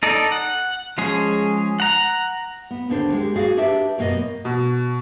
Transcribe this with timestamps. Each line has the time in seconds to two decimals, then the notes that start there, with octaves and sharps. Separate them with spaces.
0.03 D#4 A4 D5
0.32 F#5
0.98 F3 G#3 C#4 G#4
1.80 F#5 A#5
2.71 B3
2.90 D#2 D3 D4 C5
3.12 G#3 G4
3.36 F#4 G#4 D5 F5
3.57 D4 G4 B4 E5
3.98 F#2 B2 A#3 B3 D#5
4.45 B2